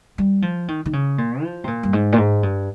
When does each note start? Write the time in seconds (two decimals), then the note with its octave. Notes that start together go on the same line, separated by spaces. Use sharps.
0.18 G3
0.42 F3
0.68 D#3
0.86 D#3
0.93 C#3
1.18 A#2
1.42 F3
1.64 C3
1.67 A#2
1.83 G2
1.93 G#2
2.13 A#2
2.18 G#2
2.43 G2